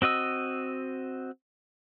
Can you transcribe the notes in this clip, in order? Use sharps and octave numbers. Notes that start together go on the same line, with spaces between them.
C4 F#4 D#5 E6